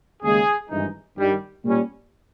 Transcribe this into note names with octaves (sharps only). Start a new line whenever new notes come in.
D#2 C#3 G#3 G#4
G#1 G2 E3 G#3 D#4
G2 D#3 G3
A#2 G3 C#4